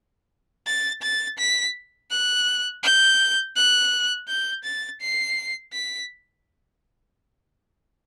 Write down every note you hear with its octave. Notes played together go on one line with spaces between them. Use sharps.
A6
A6
B6
F#6
G6
F#6
G6
A6
C7
B6